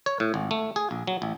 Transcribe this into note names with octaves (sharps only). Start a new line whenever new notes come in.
C#5
A2
G#1
A3
G#4
A#1
F#3
A1